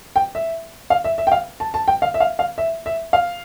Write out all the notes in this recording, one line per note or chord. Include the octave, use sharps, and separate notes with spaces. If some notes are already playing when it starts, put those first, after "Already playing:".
G5
E5
F5
E5
E5
G5
F5
A5
A5
G5
F5
E5
F5
F5
E5
E5
F5